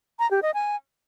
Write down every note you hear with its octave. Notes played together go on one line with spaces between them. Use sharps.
A#5
G4
D#5
G#5